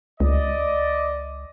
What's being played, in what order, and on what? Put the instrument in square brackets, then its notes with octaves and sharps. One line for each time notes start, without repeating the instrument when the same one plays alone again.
[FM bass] C#2 [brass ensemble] D5 D#5